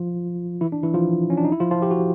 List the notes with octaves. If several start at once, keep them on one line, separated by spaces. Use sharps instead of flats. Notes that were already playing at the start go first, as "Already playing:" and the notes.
Already playing: F3 F4
E3 E4
D4
E3 E4
F3 F4
C#4
D4
D#4
E4
F3 F4
F3 F4
G4
F#4